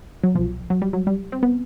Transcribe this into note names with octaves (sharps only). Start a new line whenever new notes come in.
F#3
C2 B2 F3
F#3
G3
F#3
G3
C4
B3